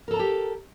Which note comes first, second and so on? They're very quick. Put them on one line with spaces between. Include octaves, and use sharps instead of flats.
A#4 A4 A#5 A5 G4